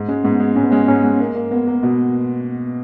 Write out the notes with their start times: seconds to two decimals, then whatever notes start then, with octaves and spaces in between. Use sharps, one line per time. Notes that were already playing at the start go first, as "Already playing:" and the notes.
Already playing: G#2
0.09 G#3 C#4
0.24 G#2 B3
0.40 G#3
0.56 G#2 C#4
0.63 B3
0.71 G#3 C#4
0.88 G#2 C#4
1.04 G#3
1.20 A#3
1.35 A#3
1.51 A#3 B3
1.67 A#3
1.83 B2